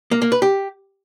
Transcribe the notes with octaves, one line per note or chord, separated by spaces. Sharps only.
A#3
A#3
B4
G4